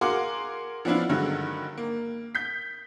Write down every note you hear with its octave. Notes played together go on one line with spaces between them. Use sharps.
F#4 G#4 A#4 F5 C6 D6
F3 B3 C#4 D4 E4 F4
G2 D3 D#3 F#3 G#3
A#3
G6 B6